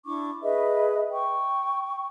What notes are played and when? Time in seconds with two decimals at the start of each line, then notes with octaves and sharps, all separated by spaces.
0.05 D4 E4 C#6 D6
0.42 G#4 B4 D#5 E5
1.12 G5 C#6